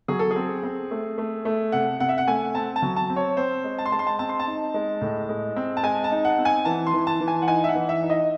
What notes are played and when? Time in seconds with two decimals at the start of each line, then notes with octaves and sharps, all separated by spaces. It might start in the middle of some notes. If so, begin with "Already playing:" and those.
0.08 F#3 G#4
0.19 A4
0.31 G#4
0.36 C4
0.63 C4
0.91 A3
1.18 A3
1.45 A3
1.72 C3 F#5
2.00 C3 F#5
2.09 E5
2.18 F#5
2.27 A3 G#5
2.55 C4 A5
2.76 A5
2.82 F#3
2.96 A5
3.10 C4
3.16 C#5
3.37 C4 C5
3.64 G#3
3.78 A5
3.86 C6
3.92 G#3 A5
3.99 C6
4.07 A5
4.19 C4 A5
4.29 C6
4.39 A5
4.47 D#4
4.74 G#3
5.01 A2
5.29 G#3
5.56 C4
5.77 A5
5.83 G#3 G#5
6.04 A5
6.11 D#4
6.25 F#5
6.38 C4
6.45 G#5
6.65 E3 A5
6.87 C6
6.94 E3
7.07 A5
7.20 E3
7.28 G#5
7.42 F#5
7.47 D#4 G#5
7.64 E5
7.69 F#5
7.75 E3
7.89 E5
8.03 D#4
8.10 D#5